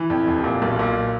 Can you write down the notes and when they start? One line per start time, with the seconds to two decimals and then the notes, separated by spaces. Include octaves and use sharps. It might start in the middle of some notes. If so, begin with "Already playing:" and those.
Already playing: E3
0.10 F2
0.27 F1
0.44 A#2
0.62 B1
0.79 A#2